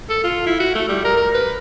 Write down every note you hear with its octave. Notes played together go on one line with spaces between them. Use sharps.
A4
F4
E4
F#4
A3
G3
A#4
A#4
B4